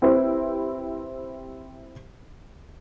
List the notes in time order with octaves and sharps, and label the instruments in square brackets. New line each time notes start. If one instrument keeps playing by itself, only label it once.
[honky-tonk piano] C4 E4 G4 B4 C5